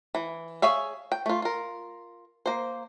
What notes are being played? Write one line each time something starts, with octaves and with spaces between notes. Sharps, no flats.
E3
G#4 C#5 E5 F5
G5
A3 F4
F4 A#4
A#3 C5